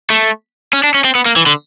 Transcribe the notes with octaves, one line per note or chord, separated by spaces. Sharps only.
A3
C#4
D4
C#4
C4
B3
A#3
E3
D3